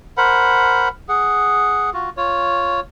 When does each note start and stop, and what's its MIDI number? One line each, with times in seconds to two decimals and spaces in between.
0.17 0.88 70
0.17 0.88 72
0.17 0.88 78
0.17 0.88 83
1.09 1.90 68
1.09 1.90 78
1.94 2.10 65
1.94 2.10 66
2.17 2.80 65
2.17 2.80 73